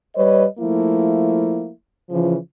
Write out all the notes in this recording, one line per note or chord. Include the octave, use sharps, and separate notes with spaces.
G3 B4 C#5 D#5
F3 A3 A#3 E4
C#3 E3 F3